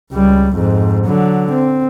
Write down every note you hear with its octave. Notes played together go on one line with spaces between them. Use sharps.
C#2 G3
F2 G#2
D3 F#3
C4